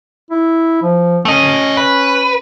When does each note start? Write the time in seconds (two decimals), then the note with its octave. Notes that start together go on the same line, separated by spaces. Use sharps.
0.31 E4
0.83 F3
1.25 A3 C#4 D#5
1.77 B4